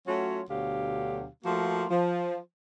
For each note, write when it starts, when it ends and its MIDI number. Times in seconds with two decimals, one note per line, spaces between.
0.07 0.42 54
0.07 0.42 57
0.07 0.42 61
0.07 0.42 65
0.07 0.42 66
0.07 0.42 73
0.50 1.27 38
0.50 1.27 47
0.50 1.27 50
0.50 1.27 54
0.50 1.27 67
0.50 1.27 77
1.45 1.85 53
1.45 1.85 57
1.45 1.85 58
1.45 1.85 65
1.45 1.85 66
1.90 2.38 53